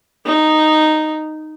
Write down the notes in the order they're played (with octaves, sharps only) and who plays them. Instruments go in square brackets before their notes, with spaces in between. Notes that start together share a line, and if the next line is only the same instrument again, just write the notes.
[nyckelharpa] D#4